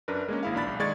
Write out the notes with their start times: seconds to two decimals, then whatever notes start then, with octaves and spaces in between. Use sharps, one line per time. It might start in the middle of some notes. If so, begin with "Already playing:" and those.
0.08 F#2 D4 A#4 B4
0.28 G#3 A#3 C#4
0.43 G#1 E4 F5
0.55 A#1 D4 B5 A6
0.67 B1
0.79 D#3 G#3 D5 C#6 G#6 A6